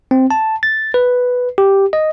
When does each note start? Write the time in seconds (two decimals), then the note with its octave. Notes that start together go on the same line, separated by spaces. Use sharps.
0.11 C4
0.31 A5
0.63 A6
0.94 B4
1.58 G4
1.93 D#5